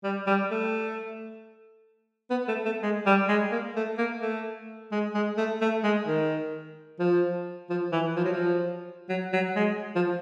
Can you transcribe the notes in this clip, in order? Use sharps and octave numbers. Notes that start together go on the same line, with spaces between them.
G3
G3
A3
B3
A3
A3
G#3
G3
G#3
A#3
A3
A#3
A3
G#3
G#3
A3
A3
G#3
D#3
F3
F3
E3
F3
F#3
F3
F#3
F#3
G#3
F3